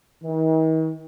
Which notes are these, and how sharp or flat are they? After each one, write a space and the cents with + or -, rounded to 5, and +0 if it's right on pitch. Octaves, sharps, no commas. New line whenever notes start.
D#3 +45